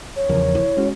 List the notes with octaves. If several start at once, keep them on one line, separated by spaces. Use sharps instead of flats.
C#5
E2 C#3 F3 A#4
E4
G#3 C#4 F#4